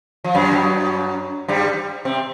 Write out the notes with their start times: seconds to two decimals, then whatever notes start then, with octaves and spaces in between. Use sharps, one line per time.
0.24 F3
0.35 F#2 F#3
1.48 G2 G3
2.05 C3 C4